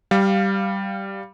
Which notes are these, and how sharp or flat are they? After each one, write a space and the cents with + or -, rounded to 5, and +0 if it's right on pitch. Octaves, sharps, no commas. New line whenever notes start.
G3 -5 F5 +0